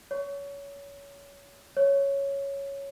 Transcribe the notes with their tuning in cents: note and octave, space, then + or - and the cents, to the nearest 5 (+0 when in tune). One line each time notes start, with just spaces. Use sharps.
C#5 +25
C#5 +0